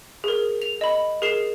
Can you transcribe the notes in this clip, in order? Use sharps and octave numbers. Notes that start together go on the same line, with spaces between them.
G#4 A#4
F7
D#5 B5
G#4 A#4 C7 E7